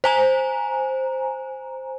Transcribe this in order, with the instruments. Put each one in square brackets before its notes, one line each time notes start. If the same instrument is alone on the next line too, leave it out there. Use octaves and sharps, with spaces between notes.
[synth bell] C5 G#5 A#5